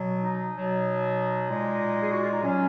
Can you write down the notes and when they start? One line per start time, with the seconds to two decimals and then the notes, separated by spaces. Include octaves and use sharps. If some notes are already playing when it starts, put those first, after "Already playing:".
Already playing: B2 F#3
0.21 D#4
0.53 B2 F#3
1.48 A#2 G#3
2.03 G#4
2.12 F#4
2.22 F4
2.32 D#4
2.41 A#2 F#3 C#4